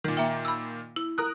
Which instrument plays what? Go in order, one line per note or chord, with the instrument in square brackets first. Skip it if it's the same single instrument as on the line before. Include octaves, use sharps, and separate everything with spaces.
[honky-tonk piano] A#2 D#3
[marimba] A#3 E5 G5
B5 E6
E4
[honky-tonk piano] A#4 D#6 F#6